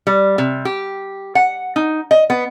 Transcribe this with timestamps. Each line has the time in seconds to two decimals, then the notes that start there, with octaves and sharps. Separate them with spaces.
0.07 G3
0.38 C3
0.65 G4
1.35 F#5
1.76 D#4
2.11 D#5
2.30 B3